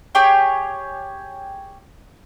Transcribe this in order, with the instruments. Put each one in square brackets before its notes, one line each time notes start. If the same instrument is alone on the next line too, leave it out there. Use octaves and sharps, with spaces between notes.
[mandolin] G4 G#4 C#5 G5